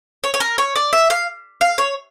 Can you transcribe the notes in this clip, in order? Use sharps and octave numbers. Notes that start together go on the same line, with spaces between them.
C#5
C#5
A#4
C#5
D5
E5
F5
F5
C#5